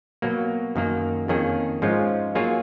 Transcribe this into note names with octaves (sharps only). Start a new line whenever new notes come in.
B2 F#3 A#3
F#2 D#3 A#3
F2 D#3 A#3 C#4 G#4
G#2 F3 G#3 C#4 F4
F#3 A#3 F4 G#4 C#5